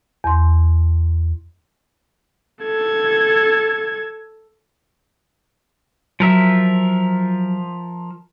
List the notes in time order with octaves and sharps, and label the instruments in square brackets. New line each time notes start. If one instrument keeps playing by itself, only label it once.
[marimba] E2 C6
[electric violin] A4 G#6
[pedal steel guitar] F3 A#4 E5 [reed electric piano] F#3